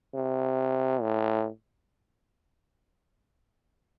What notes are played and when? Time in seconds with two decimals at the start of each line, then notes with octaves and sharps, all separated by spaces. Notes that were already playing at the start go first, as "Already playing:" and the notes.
0.15 C3
1.02 A2